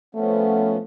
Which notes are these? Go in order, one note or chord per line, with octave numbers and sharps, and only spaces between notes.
F3 A3 B3 C#4